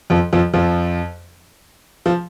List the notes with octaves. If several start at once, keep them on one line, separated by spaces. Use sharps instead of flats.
F2 F3
F2 F3
F2 F3
F3